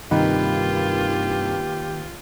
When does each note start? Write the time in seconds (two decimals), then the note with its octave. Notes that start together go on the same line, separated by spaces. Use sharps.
0.11 G2 C3 D#3 A#3 F4 G4 B4